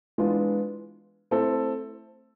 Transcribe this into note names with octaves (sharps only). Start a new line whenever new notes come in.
E3 G#3 B3 D4 F4
A3 C4 E4 A4